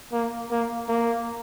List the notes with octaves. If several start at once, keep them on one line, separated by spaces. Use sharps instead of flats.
A#3
A#3
A#3